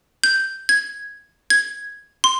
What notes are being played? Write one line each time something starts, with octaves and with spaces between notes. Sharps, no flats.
G6
G#6
G#6
C6